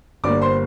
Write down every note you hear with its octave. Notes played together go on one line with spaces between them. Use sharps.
G1 G2 D3 G3 A#3 D5 D6
C5 C6